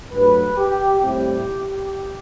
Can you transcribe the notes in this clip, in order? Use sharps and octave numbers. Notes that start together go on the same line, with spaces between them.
G2 F#3 A3 B4
G4
A2 G3 C4 E4 G4